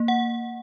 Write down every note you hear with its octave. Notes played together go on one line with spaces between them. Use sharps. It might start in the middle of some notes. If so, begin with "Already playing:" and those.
Already playing: A#3
F#5